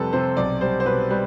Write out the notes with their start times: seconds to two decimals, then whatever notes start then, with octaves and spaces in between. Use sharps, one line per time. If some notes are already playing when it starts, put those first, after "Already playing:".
Already playing: F2 C3 G3 A4 B4
0.13 C3 C5
0.37 B1 D5
0.61 G3 C5
0.80 C5
0.85 B2 B4
1.10 G3 B4